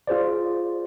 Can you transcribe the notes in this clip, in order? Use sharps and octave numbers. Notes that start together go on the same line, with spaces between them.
F4 G#4 C5 D5